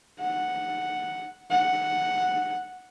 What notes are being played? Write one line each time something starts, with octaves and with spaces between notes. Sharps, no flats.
F#5
F#5